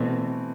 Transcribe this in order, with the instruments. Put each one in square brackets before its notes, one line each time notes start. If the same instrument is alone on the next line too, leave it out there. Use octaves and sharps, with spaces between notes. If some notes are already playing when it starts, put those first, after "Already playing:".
Already playing: [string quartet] B2 [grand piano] E3 A3 C4